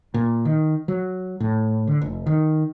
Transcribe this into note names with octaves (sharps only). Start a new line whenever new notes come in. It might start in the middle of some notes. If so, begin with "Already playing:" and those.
A#2
D#3
F#3
A2
D3
F1
D#3